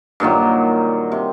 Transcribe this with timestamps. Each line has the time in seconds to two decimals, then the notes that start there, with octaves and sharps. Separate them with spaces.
0.20 G2 A#2 D#3 F#3
1.12 C3